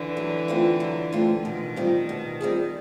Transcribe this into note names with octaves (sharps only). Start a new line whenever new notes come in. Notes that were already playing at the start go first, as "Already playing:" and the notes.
Already playing: D3 E3
F#3
A3 C4 F4
F#3
A3 C4 F4
B2 D#3
G3 C4 F4 G#4
B2
G3 C4 F4 G#4